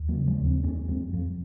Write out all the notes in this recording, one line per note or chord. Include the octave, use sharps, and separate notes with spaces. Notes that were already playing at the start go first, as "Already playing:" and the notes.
Already playing: D#2
F#3 A#3
C#3
F3 G#3
D#2
G#3 C4
F2 A#3 C#4
F2 G#3 C4
F2 F3